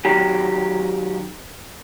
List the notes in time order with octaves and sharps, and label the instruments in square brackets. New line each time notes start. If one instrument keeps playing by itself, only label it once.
[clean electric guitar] D#3 F#3 G4